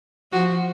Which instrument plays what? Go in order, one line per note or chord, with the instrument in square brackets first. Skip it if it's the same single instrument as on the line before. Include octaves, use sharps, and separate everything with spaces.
[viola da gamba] F3 [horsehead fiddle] F#4